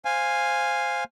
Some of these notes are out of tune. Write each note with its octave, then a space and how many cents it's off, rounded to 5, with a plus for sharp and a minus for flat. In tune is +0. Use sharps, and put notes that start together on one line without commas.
C5 +0 F5 +0 G#5 -10